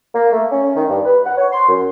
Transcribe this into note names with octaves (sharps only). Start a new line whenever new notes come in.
A#3
A3
C#4
D#3
G2
B4
F#5
C#5
C6
F#2